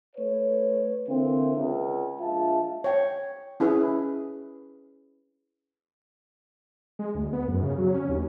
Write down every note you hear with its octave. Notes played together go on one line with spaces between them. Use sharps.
A3 B4 C#5
D3 E3 A#3 C4
C#2
A#1 G#3 F4 E5 A5
C#5 G5
C#4 E4 G#4 B4
G#3
D2
B3
F#2
C#3
F#3
C#4
D#2